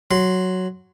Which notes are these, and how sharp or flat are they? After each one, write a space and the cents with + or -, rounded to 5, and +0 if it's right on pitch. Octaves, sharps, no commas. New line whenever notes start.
F#3 +0 C6 -5